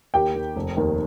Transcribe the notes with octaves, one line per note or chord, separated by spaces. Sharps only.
D#2 G4 G5
D#3
F1
D#2 D#3